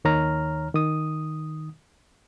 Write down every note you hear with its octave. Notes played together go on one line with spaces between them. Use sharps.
D#2 D#3 C#5 A#5 F6
D#3 D#6